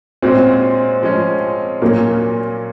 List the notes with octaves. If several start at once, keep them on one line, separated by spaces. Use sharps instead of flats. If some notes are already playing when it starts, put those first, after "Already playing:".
A#2 G#3 C4 C#4 F#4
F3 G#3 C#4
A#2 F#3 A#3 C#4